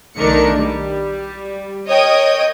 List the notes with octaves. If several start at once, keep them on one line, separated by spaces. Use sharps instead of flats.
B1 D#3 A3 D4 A#4 C#7
G3
A#4 C#5 D#5 G5 D#6